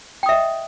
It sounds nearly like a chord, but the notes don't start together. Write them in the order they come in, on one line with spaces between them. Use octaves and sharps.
G5 D#6 E5 D#5